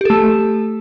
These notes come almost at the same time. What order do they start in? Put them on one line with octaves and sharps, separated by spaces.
G4 A4 A3